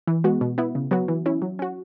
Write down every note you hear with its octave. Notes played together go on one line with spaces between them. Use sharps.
E3
G#3 B3 F#4
B2
B3 E4
C#3
F#3 B3 F#4
E3
C#4 E4
F#3
C#4 F#4